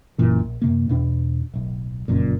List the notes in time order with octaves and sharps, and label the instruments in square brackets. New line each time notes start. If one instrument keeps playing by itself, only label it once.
[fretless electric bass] F#1 F#2 A#2 E3
A#1
F#2 C3 A#3
E2 B2 D4
D1 B1
F1 C#2 F#2 A#2